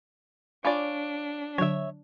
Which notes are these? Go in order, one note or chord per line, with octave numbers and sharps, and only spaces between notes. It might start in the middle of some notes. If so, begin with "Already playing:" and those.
D4 F4 C#5 D5 G#5 B5 C#6
D3 F#3 C#5 E5